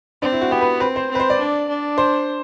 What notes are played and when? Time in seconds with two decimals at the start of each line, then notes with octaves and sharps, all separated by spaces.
0.22 C4 D4
0.33 E4
0.41 F#4
0.51 B3 G4
0.61 B4
0.80 C4 B4
0.96 C5
1.11 C4 B4
1.20 C5
1.30 D5
1.39 D4
1.69 D4
1.98 C5